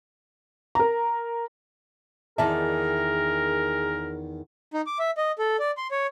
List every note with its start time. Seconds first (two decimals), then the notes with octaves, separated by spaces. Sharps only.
0.75 A#4 A#5
2.38 E2 D#3 G#4 A#4 D5 E5 A5
4.74 D#4
4.86 D6
4.99 E5
5.17 D#5
5.39 A4
5.60 D5
5.77 C6
5.91 C#5